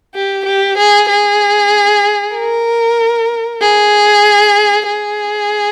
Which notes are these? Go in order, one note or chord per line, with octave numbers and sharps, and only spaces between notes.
G4
G4
G#4
G#4
A#4
G#4
G#4